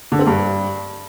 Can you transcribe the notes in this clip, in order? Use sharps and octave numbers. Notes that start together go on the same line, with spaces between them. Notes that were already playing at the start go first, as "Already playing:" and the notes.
D3
C4
G2